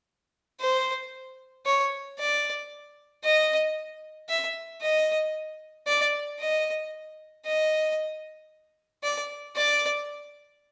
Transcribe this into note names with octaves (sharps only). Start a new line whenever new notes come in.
C5
C#5
D5
D#5
E5
D#5
D5
D#5
D#5
D5
D5